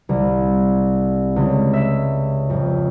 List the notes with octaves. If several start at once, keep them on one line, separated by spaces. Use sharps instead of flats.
C2
C#2
E5
F2